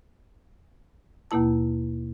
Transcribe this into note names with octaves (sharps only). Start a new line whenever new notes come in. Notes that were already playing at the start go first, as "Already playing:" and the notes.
D#2 B2 A#3 E4 A5